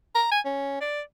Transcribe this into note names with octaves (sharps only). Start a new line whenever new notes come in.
A#5
G#5
C#4
D5